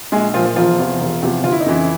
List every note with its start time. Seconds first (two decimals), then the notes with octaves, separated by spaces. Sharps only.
0.12 A#1 G#3 G#4
0.34 A#2 F3 F4
0.45 F3 F4
0.56 E1 F3 F4
0.79 E2 C3 F3
1.00 E1
1.22 E2 C3 F3
1.44 G1 F4
1.52 E4
1.60 D#4
1.66 F2 C#3 E3 E4